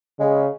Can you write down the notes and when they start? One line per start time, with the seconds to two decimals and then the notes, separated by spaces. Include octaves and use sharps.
0.19 C#3 G#3